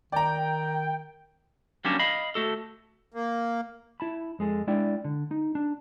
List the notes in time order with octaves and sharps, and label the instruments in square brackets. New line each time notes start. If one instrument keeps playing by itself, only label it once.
[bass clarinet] D#3 [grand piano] D5 A#5 [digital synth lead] G5
[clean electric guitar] F#3 G3 A#3 C#4 D4
D#5 F5 B5
A3 F#4 A4
[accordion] A#3
[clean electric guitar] E4 A5 B5
F2 G#3 G#4 A4
G#3 D4 E4 D5 G5
D3
D#4
D4